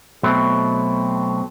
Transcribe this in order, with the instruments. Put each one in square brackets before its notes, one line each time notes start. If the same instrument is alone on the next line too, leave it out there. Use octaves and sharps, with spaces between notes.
[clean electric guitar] B1 B2 F#3 A3 C4